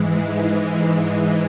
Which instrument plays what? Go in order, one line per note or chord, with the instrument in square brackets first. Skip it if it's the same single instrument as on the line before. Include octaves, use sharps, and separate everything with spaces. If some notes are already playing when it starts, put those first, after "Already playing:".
Already playing: [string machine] G#2 E3 G#3